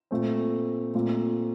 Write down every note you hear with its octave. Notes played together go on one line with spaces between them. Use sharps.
A#2 A3 C4
A#2 A3 C4